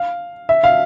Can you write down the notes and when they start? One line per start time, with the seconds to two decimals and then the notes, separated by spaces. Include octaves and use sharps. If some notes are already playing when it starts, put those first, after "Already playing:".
Already playing: F5
0.49 E5
0.64 F5